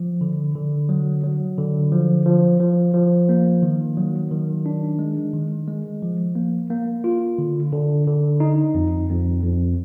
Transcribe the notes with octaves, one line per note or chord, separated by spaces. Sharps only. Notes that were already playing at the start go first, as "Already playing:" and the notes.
Already playing: F3
D3
D3
F#3
F#3
D3
F3
F3
F3
F3
A#3
D#3
F#3
D#3
D4
G#3
D#3
G#3
F3
A#3
A#3
F4
D3
D3
D3
D#4
F2
F2
F2